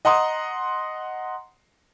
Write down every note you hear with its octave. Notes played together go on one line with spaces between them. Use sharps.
D#5 F#5 A#5 C6 D#6